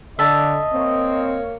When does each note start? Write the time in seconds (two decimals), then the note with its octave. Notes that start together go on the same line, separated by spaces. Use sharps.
0.19 D3 D#5 E5 A5
0.73 A#3 C4 C#5